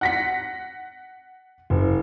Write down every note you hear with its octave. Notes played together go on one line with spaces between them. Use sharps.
F#5 A#6 B6
F#1